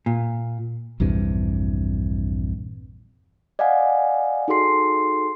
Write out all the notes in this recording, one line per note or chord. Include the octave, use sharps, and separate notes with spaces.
A#2
A#1 E2 G2 C3
D5 D#5 F5 F#5 G#5
D#4 F#4 G#4 A4 C6 C7